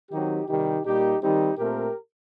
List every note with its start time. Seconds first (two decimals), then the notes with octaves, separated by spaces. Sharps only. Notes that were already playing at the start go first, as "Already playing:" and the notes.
0.11 D#3 F#3 C4 D#4 G4
0.48 C3 D#3 G3 D#4 G4
0.85 A#2 G3 A#3 D#4 G4
1.22 D#3 G3 C4 D#4 G4
1.58 A#2 A3 C4 G4 A#4